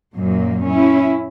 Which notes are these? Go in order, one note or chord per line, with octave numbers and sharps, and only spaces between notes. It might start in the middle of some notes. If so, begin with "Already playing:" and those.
F#2 A#2 F#3 A#3
C#4 E4